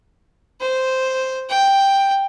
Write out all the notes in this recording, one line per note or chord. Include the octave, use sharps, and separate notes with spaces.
C5
G5